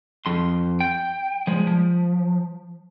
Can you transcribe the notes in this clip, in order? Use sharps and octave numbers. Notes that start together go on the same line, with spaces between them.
F2 C6
G5
F3 G#3
F3